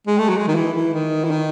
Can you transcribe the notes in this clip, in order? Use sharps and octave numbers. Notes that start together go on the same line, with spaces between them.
G#3
A3
F#3
G#3
D#3
E3
E3
D#3
E3
D#3